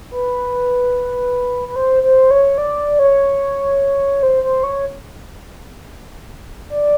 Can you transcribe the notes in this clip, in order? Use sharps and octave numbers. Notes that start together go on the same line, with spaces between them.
B4
B4
C5
C5
C#5
D5
C#5
C5
C5
C#5
D5